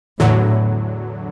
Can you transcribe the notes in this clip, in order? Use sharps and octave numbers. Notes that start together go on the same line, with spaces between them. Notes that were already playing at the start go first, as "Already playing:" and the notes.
E2 A2 D3 F#3